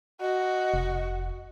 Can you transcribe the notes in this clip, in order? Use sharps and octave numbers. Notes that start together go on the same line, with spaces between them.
F#4 D#5
F1